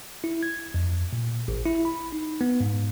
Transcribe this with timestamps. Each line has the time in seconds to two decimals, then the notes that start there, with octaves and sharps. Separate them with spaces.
0.24 E4
0.43 G#6
0.74 F2
1.13 A#2
1.48 A1
1.65 E4
1.85 B5
2.12 D#4
2.41 B3
2.60 G#2